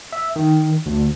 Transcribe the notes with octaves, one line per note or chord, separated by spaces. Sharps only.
E5
D#3
D2